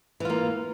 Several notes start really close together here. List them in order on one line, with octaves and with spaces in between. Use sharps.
E3 F4 A#3